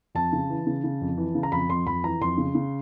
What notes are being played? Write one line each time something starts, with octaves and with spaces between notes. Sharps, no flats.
F2 A5
C#3
E3
C#3
C#3
F2
E3
C#3
A#5
F2 B5
F2 C6
F2 B5
E3 A#5
F2 C6
C#3
C#3